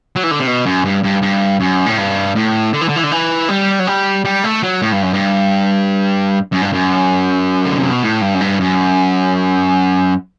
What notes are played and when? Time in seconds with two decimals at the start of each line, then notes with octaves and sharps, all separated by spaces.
0.16 F#3
0.23 E3
0.31 D3
0.40 C3
0.47 B2
0.66 F#2
0.85 G2
1.03 G2
1.22 G2
1.60 F#2
1.86 A2
1.98 G2
2.35 A2
2.73 D3
2.81 E3
2.89 D3
2.96 E3
3.03 D3
3.11 E3
3.49 G3
3.79 F#3
3.87 G3
4.25 G3
4.44 A3
4.63 F#3
4.82 A2
4.92 G2
5.02 F#2
5.13 G2
6.52 F#2
6.62 G2
6.73 F#2
7.66 D3
7.78 C3
7.90 B2
8.03 A2
8.21 G2
8.34 F#2
8.41 G2
8.60 F#2